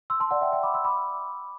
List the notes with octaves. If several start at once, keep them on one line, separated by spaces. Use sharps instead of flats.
C6 E6
A5 C6
D5 F#5
E5 G5
E5 G5
B5 D6
C6 E6
B5 D6